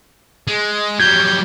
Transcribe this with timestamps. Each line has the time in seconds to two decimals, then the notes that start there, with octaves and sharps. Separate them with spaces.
0.47 G#3
1.00 F#3 G3 G6 G#6